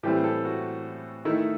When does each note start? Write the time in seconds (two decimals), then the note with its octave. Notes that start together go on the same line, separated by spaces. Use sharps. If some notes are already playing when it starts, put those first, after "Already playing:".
0.03 A2 E3 G3 C4 G4
0.24 A4
0.45 F#4
1.25 D#3 A3 D#4 E4